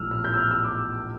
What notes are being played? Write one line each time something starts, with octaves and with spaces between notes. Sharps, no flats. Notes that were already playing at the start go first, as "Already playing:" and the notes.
Already playing: A#1 A2 F3 A3 E6 F6
F6
G6
E6
F6
E6
D6